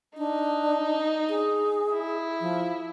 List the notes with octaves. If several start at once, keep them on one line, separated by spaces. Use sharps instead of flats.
D4 D#4
G#4
E4
F3